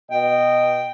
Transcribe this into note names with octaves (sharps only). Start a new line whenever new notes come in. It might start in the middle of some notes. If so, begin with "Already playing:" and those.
B2 D#5 G5